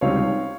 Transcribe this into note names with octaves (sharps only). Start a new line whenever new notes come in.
C#2 C3 G3 C4 D#4 C#5 F5